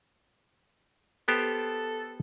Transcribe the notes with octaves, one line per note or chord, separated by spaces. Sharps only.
B3 G4 A4 C5